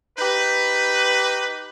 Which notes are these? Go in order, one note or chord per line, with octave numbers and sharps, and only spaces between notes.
D#4 G4 B4